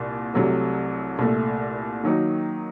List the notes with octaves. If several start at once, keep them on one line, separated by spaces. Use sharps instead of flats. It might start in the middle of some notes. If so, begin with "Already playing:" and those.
Already playing: C2 A#2
C2 C3 F#3 A3
C2 A#2 A3
D#3 F#3 A#3 D#4